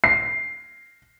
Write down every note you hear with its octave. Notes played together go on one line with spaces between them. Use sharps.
C7